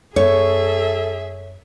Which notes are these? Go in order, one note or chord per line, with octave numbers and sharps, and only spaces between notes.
F#2 B3 G#4 A4 C#5 E5